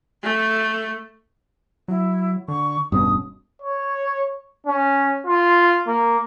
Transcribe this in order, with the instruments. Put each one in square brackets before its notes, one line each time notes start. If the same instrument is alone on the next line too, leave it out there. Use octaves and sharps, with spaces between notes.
[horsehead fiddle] A3
[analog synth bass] F#3 [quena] E4
[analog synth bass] D3 [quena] C#6
[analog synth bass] E1 [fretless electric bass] G2 B2 C#4 [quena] D#6
[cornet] C#5
C#4
F4
A#3